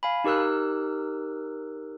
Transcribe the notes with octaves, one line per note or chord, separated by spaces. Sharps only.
F5 G#5 B5
D#4 G4 A#4 E6 F#6